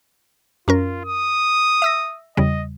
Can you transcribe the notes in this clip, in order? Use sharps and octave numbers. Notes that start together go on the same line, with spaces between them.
F#2 C#4 F4 A#4
D#6
E5 E6 A#6
E2 C#3 G3 D#5